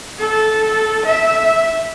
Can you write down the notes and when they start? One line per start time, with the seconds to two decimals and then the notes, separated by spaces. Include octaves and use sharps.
0.19 A4
1.06 E5